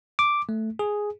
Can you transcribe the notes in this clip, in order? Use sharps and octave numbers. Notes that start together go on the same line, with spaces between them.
D6
A3
G#4